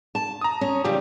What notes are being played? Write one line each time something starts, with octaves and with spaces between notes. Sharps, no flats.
A5
A#5 D#6
C#4
C#3 F3 G3 G4